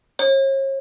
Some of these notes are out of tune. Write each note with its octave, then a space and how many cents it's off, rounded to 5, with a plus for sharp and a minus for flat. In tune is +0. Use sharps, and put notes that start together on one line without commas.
C#5 -40